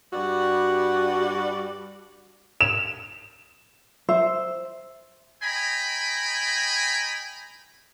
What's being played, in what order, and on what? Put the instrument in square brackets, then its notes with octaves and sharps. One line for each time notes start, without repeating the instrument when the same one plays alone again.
[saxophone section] G2 G3 F#4 D5
[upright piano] E7
[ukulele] C5 E5
[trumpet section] D#5 G5 G#5 A#5 B5